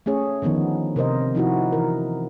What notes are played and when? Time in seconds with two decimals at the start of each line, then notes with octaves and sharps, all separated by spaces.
0.06 A3 C#4 G#4 C#5
0.42 D3 D#3 F3 B3 D#4
0.96 C3 A#4 C5 D#5
1.35 F3 D#4 E4 F#4
1.72 E3 A#4